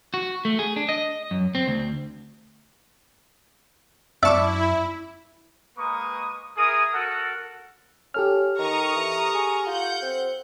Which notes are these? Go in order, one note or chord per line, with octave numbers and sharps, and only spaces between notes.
F#4
A3
G#4
D4
D#5
F#2
C4
D2
F#2 E4 D5 E5 A5 C#6 D6
G#3 A#3 B4 A#5 C#6 D#6
E4 G#4 A#4 D#6
F#4 A4 A#4 F#5
C#4 G4 A4 F6
D#3 A#5 C#6 D#6
E3
G#4
F4 F#5 G6
C4